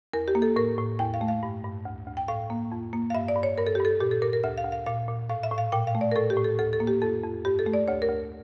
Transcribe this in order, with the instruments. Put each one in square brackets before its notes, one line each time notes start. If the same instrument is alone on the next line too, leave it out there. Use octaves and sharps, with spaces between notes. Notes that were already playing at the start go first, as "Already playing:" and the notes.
[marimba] E2 A#4
G4
A#3
A4
A2 A#4
A2
E2 G5
F5
A3
F5
G2
G2
D2
D2
G5
A2 F5
A#3
F2
A#3
F5
G2 E5
D5
G2
C#5
G2 A#4
A4
G2 G4
A4
A#2 G4
A4
A#2 A#4
A#4
D2 E5
F5
D2
F5
A#2 F5
A#2
A2 F5
E5
A2
F5
A#2 G5
F5
A3
D5
A#4
A2 A4
G4
A2
A4
D2 A4
A4
A#3
G4
F2 A4
F2
G2 G4
A4
A3
D5
D2 C#5
A#4
D2